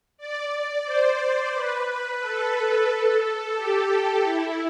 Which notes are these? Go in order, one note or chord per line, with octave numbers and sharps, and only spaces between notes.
D5
C5
B4
A4
G4
E4